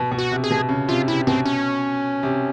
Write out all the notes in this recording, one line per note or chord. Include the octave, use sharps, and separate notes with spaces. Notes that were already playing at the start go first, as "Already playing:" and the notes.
Already playing: B2
B2
F#4
C3
G#4
B2
C#3
C3 F4
C3 E4
B2 C4
C#4
C3